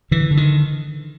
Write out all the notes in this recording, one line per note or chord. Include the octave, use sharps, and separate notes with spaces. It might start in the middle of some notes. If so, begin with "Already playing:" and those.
D3 E3
D3
D#3